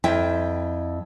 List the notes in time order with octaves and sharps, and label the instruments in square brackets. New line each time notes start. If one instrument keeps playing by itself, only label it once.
[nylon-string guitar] F2 E4 G5